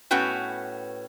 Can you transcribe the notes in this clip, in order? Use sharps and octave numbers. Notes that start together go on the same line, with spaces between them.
A2 B3 C#4 F#4 B4 G5